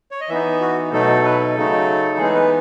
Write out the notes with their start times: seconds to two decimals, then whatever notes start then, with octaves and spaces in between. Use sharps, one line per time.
0.11 C#5
0.21 D#5
0.29 E3 B3 D#4 E5
0.61 F#4
0.92 B2 F#3 A3 D#4 A4
1.24 B4
1.40 A4
1.56 C#3 F#3 A3 D#4
2.18 E3 G#3 B3 D#4 G#4
2.34 B4